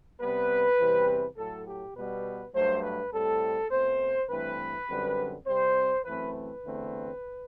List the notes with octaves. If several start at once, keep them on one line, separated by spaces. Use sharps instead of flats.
C3 G3 B3 B4
E2 C3 E3 G3 C4
A2 F#3 A3 A4
G4
B2 G3 B3 B4
G2 F#3 A3 C5
B4
A2 G3 C4 A4
B2 A3 C4 C5
G2 E3 A3 C4 B4
F#2 D3 G3 C4
C3 G3 C4 C5
F#2 E3 A3 C4 B4
B4
E2 D3 A3 C4